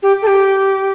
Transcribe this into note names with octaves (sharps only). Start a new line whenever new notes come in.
G4
A4
G4